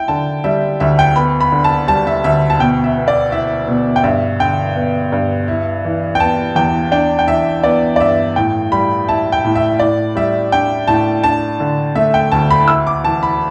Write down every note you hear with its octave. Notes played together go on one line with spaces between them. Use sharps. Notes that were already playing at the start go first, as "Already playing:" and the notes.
Already playing: E4 G5
D3 A5
G3 E5
D2 E5
G5
B3 B5
B5
D3
A5
G3 A5
E5
D2 E5
A5
B2 G5
E5
B3
D5
E4 E5
B2
G5
G2 E5
D3 G5
B3
G2
E4
E3
G5
B3 A5
E2 G5
D4 G5
G5
E3 E5
B3 D5
D5
G2 E5
A2 G5
G3 B5
E4 A5
G5
A2
E5
A2 D5
G3 E5
D4 G5
A2 A5
D4 A5
D3
A3 E5
G5
D2 A5
B5
E4 E6
D6
E3 A5
B5